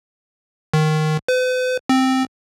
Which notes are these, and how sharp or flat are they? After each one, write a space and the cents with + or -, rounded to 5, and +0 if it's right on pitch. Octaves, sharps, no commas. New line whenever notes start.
D#3 -5
B4 +45
C4 +0